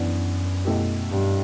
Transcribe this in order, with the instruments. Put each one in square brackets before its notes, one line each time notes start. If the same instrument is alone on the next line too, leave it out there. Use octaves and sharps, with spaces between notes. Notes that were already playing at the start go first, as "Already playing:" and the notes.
Already playing: [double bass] F#2 [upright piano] E3 B3 D4
[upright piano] B2 A3 E4 G4
[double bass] G2